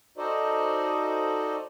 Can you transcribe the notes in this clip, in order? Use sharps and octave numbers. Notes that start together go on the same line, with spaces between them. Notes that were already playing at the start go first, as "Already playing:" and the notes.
D#4 F#4 A4 C5 D5 D#5